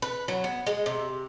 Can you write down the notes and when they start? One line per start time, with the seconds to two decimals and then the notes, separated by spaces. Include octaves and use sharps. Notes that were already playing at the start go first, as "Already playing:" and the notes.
0.02 B4
0.28 F#3
0.44 B3
0.66 G#3
0.86 C3